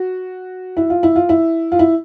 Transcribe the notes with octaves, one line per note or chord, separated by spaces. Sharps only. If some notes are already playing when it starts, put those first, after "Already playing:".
Already playing: F#4
E4
F4
E4
F4
E4
F4
E4